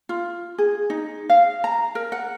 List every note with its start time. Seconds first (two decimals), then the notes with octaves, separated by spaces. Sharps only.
0.09 F4
0.58 G#4
0.90 D#4
1.30 F5
1.64 A#5
1.95 A#4
2.12 F#5